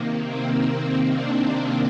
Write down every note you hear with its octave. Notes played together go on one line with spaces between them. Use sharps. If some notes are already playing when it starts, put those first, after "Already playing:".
Already playing: C3 D#3 A#3
C4
D4